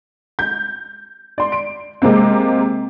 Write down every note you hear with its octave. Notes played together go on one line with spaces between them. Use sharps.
G6
D5 C6
D7
C3 G#3 A#3 C4